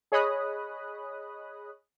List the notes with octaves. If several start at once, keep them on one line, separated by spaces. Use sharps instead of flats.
G#4 C#5 D#5 B5 D#6 F#6